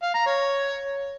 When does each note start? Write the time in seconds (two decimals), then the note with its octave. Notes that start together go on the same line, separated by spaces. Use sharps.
0.03 F5
0.15 A#5
0.26 C#5